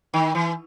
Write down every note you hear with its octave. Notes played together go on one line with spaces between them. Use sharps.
D#3
E3